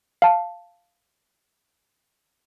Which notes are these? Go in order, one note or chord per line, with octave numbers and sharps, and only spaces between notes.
F5 A5